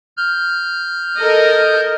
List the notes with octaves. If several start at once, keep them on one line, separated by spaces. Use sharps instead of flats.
F6 G6
A4 A#4 D#5